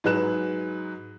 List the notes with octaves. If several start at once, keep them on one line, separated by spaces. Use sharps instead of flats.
G#2 F#3 G#4 B4 F#6 E7